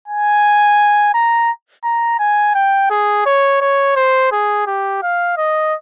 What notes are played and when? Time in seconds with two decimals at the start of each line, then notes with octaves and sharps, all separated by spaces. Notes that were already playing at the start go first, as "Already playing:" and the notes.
0.08 G#5
1.14 A#5
1.84 A#5
2.20 G#5
2.55 G5
2.90 G#4
3.26 C#5
3.61 C#5
3.97 C5
4.32 G#4
4.67 G4
5.03 F5
5.38 D#5